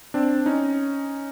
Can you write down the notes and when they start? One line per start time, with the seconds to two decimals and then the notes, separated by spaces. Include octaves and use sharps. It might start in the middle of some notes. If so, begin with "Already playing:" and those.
0.14 C4 D4
0.46 C#4 D#4